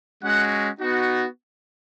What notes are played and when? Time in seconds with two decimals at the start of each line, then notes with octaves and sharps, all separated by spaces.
0.24 G#3 C#4 F#4 F#5
0.80 B3 D#4 F#4